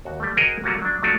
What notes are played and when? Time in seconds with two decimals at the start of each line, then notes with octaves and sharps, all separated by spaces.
0.05 D#2 F#4
0.20 G3 A3
0.37 F#4 G#4 A#4 C5 D#5
0.64 F#3 G3 A3 A#3 F4 F#4
0.82 F#3 D4
1.03 F#3 G#3 A3 D4 F4 F#4